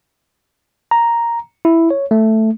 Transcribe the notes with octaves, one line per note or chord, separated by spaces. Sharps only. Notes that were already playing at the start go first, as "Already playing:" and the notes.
A#5
E4
C#5
A3